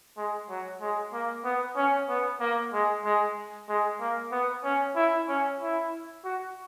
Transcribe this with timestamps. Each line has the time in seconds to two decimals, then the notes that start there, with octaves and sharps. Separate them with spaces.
0.17 G#3
0.49 F#3
0.81 G#3
1.13 A#3
1.44 B3
1.76 C#4
2.09 B3
2.40 A#3
2.73 G#3
3.05 G#3
3.69 G#3
4.00 A#3
4.32 B3
4.64 C#4
4.96 E4
5.28 C#4
5.60 E4
6.24 F#4